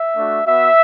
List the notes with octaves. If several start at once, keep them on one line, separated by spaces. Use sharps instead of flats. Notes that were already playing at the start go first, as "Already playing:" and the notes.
Already playing: E5
A3 D4 F#4
B3 F#4 E5